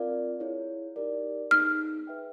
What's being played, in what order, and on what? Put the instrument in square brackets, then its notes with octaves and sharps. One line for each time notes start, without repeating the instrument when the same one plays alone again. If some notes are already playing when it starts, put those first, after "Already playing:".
Already playing: [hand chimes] C4 F4 A#4 D5 F5
E4 G#4 C#5
D#4 G4 A#4 D5
[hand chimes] B3 D#4 G#4 [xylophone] F6
[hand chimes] G#4 B4 E5 G5